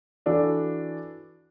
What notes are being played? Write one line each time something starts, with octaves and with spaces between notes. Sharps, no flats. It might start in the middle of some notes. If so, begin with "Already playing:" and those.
E3 D4 F#4 A4